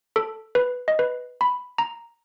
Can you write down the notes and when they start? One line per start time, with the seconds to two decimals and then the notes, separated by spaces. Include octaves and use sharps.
0.16 A4
0.55 B4
0.88 D#5
0.99 B4
1.41 B5
1.78 A#5